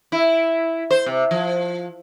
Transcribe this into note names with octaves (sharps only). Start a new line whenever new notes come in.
E4
C5
C3
F3